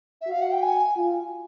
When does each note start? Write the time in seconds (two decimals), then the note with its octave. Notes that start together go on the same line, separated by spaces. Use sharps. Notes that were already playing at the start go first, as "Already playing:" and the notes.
0.21 E5
0.27 F#4 F5
0.42 F#5
0.52 G5
0.63 G#5
0.96 F4